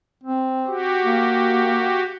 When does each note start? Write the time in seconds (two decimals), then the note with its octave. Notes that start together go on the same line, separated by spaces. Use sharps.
0.24 C4
0.67 F#4 G4
1.05 A#3